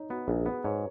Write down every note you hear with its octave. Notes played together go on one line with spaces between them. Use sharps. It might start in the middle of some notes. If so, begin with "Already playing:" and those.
Already playing: D#4 C#5
B3 F#4
A#1 G#4
B3 B4
G#2 C#5